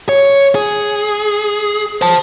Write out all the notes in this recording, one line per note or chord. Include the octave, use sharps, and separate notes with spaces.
C#5
G#4
C5 A5